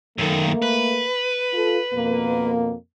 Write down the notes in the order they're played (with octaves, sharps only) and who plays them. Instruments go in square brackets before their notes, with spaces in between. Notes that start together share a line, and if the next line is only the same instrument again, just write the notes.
[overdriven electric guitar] F#2 D#3 [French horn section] A3 A#3
[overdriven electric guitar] B4
[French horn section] F4 A4
F2 B2 A#3